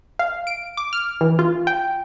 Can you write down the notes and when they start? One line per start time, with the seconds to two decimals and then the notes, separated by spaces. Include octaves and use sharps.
0.19 F5
0.47 D7
0.77 D6
0.93 F6
1.21 E3
1.39 F4
1.67 G5